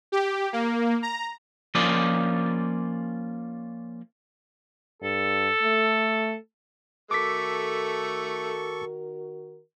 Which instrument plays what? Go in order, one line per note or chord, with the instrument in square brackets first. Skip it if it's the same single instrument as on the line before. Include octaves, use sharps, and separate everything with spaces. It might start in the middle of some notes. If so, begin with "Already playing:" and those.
[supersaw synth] G4
A#3
A#5
[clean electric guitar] F3 A#3 C#4 F4 D5 D#5
[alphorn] G2 [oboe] A4
[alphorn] A3
[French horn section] D#3 F#4 A#4 [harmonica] A3 [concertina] A4 C#6 [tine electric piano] D6 B6